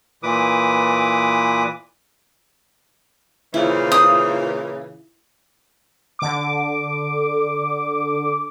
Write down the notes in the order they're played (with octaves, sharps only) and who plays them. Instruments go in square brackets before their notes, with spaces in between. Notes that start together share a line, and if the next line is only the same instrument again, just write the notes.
[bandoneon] A#2 E3 B4 D6 D#6
[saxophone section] A#2 C#3 E3 [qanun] E4 [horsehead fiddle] F4 C5
[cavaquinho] D#6
[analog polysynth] D3 D6